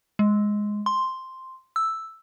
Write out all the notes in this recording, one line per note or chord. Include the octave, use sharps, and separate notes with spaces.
G#3
C6
E6